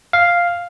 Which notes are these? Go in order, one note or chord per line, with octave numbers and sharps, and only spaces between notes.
F5